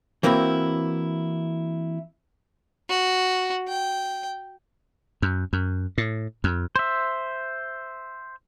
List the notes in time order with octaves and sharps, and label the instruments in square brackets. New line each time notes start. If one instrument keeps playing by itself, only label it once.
[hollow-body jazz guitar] E3 A#3 C4 E4 F#4
[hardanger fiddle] F#4
G5
[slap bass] F#2
F#2
A2
F2
[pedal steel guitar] C5 E5